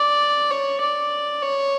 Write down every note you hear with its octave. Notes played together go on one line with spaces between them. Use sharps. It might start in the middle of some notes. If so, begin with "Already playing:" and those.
Already playing: D5
C#5
D5
C#5